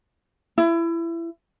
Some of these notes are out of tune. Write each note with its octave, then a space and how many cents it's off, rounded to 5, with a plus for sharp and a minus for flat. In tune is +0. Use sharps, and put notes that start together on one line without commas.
E4 +25